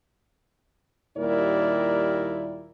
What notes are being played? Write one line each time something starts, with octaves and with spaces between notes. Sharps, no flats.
D#2 A#2 G3 E4 A#4 D5